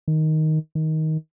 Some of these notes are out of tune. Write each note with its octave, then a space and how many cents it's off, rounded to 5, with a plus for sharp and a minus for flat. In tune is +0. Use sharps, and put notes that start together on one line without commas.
D#3 +5
D#3 +15